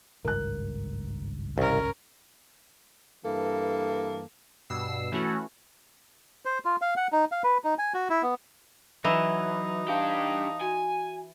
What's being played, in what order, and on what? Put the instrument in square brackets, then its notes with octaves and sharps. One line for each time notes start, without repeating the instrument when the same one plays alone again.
[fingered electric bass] G#1 C#2 G2 [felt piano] A#4 F#6
[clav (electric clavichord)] C2 [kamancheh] C#4 A#4
[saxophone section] G2 E3 A#3 A4
[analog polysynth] G2 B2 E6 C7
E3 A3 C#4 E4 F#4
[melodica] C5
F4
F5
F#5
D#4
F5
B4
D#4
G#5
F#4
E4
B3
[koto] E3 [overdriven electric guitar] F#3 [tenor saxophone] D#4
[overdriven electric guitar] D4 G4 [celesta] F5 A5
[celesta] F#4 [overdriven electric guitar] G#5